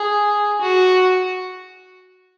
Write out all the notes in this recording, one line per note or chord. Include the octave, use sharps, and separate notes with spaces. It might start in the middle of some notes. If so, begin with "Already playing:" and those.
Already playing: G#4
F#4